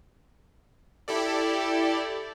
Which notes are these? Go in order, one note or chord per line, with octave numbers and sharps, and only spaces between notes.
E4 G4 A4 D5